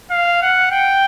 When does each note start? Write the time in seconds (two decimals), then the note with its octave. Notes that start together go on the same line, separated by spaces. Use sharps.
0.11 F5
0.42 F#5
0.71 G5